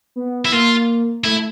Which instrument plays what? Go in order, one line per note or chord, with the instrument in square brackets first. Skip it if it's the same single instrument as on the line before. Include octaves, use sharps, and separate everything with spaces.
[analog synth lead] B3
[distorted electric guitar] E4
[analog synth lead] A#3 [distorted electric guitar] F4
[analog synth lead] A3 [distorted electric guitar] E4